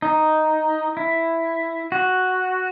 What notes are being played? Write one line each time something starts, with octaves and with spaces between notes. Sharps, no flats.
D#4
E4
F#4